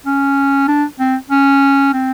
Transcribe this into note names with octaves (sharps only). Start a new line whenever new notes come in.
C#4
D4
C4
C#4
C4